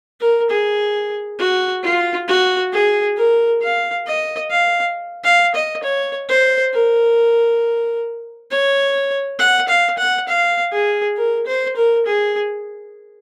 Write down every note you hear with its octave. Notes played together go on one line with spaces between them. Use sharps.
A#4
G#4
F#4
F4
F#4
G#4
A#4
F5
D#5
F5
F5
D#5
C#5
C5
A#4
C#5
F#5
F5
F#5
F5
G#4
A#4
C5
A#4
G#4